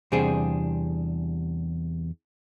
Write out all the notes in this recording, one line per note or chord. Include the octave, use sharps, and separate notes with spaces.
E2 C3 G3 D4 G#4 C5